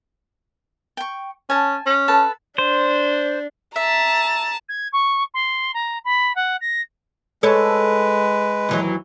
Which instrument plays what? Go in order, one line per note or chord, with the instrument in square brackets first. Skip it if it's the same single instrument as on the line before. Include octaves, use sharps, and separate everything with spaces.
[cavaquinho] G5 C#6
[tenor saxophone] C#4 [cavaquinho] G#5 A5
[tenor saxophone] C#4
[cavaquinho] A4 B4 A5
[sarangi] D4 [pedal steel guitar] C5
[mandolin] E5 [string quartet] A5 [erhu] A#5
[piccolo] G#6
C#6
C6
A#5
B5
F#5
A#6
[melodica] G#3 B4 [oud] A4 C#5
[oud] D#2 E3 F#3